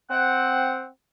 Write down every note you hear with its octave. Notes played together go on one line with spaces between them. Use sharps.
C4 F#5